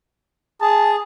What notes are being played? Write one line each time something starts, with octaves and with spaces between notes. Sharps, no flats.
G#4 A5